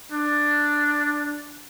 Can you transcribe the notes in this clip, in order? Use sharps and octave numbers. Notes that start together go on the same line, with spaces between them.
D4